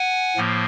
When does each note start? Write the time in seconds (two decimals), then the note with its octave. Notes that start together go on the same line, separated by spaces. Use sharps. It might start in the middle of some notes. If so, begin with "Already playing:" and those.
Already playing: F#5 G#5
0.37 A2 F3 A#3